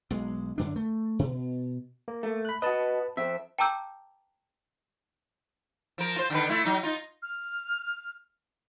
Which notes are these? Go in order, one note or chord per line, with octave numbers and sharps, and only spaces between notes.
B1 G#3
F#2 D3 D4
A3
B2
A#3
A3
B5 F#6
F#4 B4 D#5 A5
F2 C4 E5
G5 A5 A#5 D6 E6 G6
F3 A#4
F4 C5
D3 D#3 B4
A3 E4 F4
F#3 D#4
D#4 F4
F6